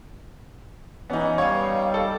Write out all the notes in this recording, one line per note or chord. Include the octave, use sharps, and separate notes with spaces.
E3 B3 C#4 D#4
G3 C#5 F5
A4